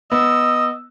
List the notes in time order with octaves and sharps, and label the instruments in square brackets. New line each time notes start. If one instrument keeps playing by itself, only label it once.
[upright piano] B3 [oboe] D#5 [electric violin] E6